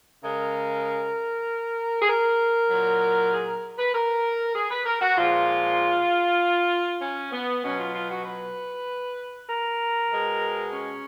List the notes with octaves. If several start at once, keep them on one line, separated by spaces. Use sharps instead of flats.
C#3 G#3 A#4
G#4
A#4
A#2 F#3
G#4
A#4
B4
A#4
G#4
B4
A#4
F#4
A#2 F3 G#3 F4
C#4
B3
B2 F#3 C#4
F4
F4
F#4
B4
A#4
B2 G#3
C#4